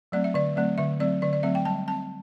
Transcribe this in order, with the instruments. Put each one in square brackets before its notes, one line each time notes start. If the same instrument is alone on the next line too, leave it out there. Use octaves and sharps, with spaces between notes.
[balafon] F#3 A3 C4 D5
E5
D3 D5
F#3 A3 C4 D5
D3 E5
F#3 A3 C4 D5
D3 D5
D5
F#3 A3 C4 E5
G5
G3 A5
C4 A5